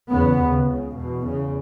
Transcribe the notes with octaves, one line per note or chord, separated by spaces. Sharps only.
E2 C#3 B3
D#2 C#3
C#2 C#3
E2 B2
E2 C#3